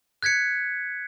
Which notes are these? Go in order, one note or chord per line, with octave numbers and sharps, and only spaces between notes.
F#6 G#6 B6 C#7